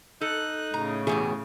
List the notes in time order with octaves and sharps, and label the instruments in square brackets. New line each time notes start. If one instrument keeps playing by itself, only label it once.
[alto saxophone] D#4 [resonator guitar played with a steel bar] A4 [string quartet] F#6
[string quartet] A2 C#3 [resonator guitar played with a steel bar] A#5
[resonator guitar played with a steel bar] E2 B2 G4 [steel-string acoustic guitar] G#4